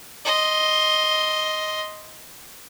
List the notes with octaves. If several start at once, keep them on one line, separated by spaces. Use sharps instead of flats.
D#5 C6